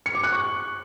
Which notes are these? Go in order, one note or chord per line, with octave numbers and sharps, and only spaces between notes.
C#7
D6
F#6
C#6